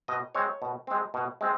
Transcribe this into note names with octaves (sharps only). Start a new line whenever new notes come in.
B2 D#5
G#3 C4 C#5
B2
G#3 C4
B2
G#3 C4